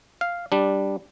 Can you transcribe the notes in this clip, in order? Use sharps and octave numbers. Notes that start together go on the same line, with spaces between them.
F5
G3 D4